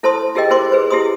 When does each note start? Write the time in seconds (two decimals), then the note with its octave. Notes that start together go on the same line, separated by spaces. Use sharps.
0.03 E4 A4 C5 A5 C6 D#6
0.35 F4 G4 G#4 A#4 D#5 G5
0.50 E4 A#4 C5 C6 D6
0.72 G#4 B4 C5
0.90 E4 G4 G#4 C6 D#6